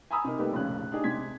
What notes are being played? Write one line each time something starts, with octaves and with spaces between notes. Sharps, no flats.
G#5 A#5 B5 D#6 E6
C3 D#4 A#4
G3 A3 A#3 D#4 G4 B4
F1 A#1 C#3 C#4 F#6
D4 D#4 G4 G#4
C3 G#3 G#6 B6